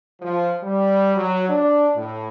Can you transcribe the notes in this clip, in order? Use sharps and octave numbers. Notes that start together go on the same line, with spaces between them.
F3
G3
F#3
D4
A2